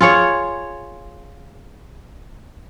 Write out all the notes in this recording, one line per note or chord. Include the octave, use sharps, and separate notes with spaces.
F4 G#4 C#5